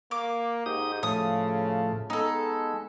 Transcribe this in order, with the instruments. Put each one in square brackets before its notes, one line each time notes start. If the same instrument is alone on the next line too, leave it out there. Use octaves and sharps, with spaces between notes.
[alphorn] A#3 [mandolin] D6
[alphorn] G#2 [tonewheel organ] D#4 G4 D#6
[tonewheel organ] A2 F3 A3 [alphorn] C#3 [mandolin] D#6
[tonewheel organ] G#3 B3 [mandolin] D#4 A4